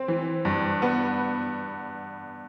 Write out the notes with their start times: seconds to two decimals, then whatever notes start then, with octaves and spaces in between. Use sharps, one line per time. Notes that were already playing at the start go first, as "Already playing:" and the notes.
Already playing: C4
0.08 E3
0.45 G2
0.82 B3